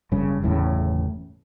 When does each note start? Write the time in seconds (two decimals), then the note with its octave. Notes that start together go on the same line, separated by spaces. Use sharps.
0.12 F#1 G2 C#3
0.42 G1 E2 A2 C#3